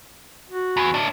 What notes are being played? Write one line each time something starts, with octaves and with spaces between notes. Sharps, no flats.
F#4
E2
A2 D4